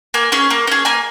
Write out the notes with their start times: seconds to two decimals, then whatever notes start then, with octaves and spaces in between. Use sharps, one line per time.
0.14 A#3 G#5
0.32 C#4 G#4
0.50 A#3
0.67 C#4 G#4
0.85 A#3 G#5